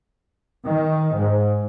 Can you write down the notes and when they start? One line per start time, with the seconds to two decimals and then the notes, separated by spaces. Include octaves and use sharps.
0.65 D#3
1.15 G#2